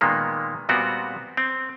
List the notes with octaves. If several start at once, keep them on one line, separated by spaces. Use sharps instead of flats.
A#2 D#3 G#3 A#3 B3
A#2 G3 B3 C4 F#4 A#4
C4